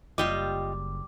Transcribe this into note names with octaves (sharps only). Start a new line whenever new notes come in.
F#1 G3 F4 G4 D#5 D6